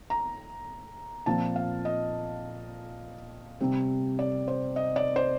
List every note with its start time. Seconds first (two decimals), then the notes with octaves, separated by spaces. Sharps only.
0.10 A#5
1.26 A#2 F3 C4 A5
1.56 F5
1.85 D#5
3.60 C3 G3 C4
4.19 D5
4.48 C5
4.76 D#5
4.96 D5
5.16 C5